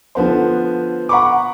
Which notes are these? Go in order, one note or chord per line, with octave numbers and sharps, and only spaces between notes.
D3 F3 B3 C5
F#5 A#5 B5 C#6 D6